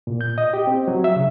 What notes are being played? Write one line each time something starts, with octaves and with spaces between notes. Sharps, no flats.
A#2
G6
D#5
G4
C4
F#3
E5
C#3